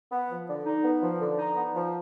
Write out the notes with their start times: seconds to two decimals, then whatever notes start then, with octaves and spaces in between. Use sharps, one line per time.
0.11 B3
0.29 F3
0.48 D3
0.65 D#4
0.84 B3
1.01 F3
1.20 D3
1.37 D#4
1.55 B3
1.74 F3